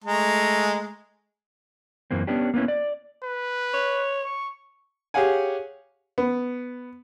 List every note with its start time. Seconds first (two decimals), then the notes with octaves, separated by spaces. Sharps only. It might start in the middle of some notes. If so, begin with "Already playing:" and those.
0.04 G#3 A3 A#5
2.11 F#2 E3 A#3 C4
2.27 B3 C#4 D4 G4
2.54 A#3 B3 C#4 E4
2.68 D5
3.24 B4
3.73 C#5
4.25 C#6
5.14 G4 G#4 C#5 F5 F#5 G#5
6.18 B3